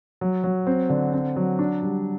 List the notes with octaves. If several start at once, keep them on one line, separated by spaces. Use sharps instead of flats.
F#3
F#3
C4
D3
C4
F#3
D4
G3